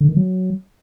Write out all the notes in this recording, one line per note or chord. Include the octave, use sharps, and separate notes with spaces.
D3
D#3
F#3